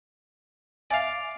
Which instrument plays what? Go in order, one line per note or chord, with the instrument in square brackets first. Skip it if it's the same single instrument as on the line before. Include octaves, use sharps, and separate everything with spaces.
[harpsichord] D5 F5 [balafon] E5 G#5